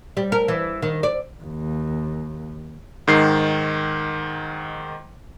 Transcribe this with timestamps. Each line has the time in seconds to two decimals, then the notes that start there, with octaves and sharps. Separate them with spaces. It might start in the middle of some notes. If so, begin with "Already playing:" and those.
0.17 G3
0.32 A#4
0.48 E3
0.82 D#3
1.03 D5
1.43 D#2
3.07 G#2 D#3 C7